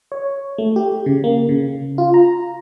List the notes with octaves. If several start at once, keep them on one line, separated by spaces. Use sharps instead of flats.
C#5
A3
G4
C#3
A#3
C#3
F4
A#5